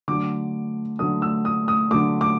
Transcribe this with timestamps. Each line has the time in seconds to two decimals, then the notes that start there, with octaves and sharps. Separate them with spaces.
0.08 D3 F#3 A3 D6
0.99 D3 F#3 A3 D#6
1.22 E6
1.45 D#6
1.68 D#6
1.91 D3 F#3 A3 D6
2.21 D6